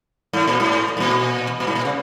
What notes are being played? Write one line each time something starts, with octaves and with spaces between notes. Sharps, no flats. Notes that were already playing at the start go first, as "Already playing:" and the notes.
G#2
A#2
G#2
G#2
A#2
A#2
G#2
A#2
C#3